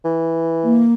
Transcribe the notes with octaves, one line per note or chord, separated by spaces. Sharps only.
E3
A#3